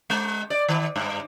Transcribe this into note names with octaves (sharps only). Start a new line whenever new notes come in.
G#3
D5
D#3
G2